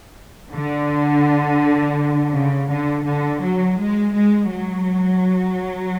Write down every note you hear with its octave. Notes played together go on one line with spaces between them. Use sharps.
D3
C#3
D3
D3
F#3
G#3
G#3
F#3